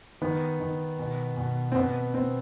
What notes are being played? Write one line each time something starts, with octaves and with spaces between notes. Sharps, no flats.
D#3 B3
D#3
B2
B2
C4
B2 B3
B2 C4